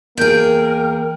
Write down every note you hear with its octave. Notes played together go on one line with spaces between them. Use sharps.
E2 A#3 G#4 A#4 G5